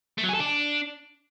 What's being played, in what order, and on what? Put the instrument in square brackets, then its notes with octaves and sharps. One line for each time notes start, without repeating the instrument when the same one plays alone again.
[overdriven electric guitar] A3
F#3
G#4
A4
D4